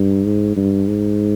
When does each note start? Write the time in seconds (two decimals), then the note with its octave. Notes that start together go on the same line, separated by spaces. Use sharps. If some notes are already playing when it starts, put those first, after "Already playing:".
Already playing: G2
0.26 G#2
0.56 G2
0.88 G#2